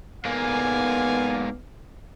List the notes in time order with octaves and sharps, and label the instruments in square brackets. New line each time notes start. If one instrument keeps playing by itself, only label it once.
[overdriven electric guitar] G#2 A#3 [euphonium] B3 [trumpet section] D5 F5 G#5